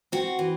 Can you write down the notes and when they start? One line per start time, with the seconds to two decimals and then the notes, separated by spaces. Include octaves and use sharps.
0.12 C4 F#4
0.39 E3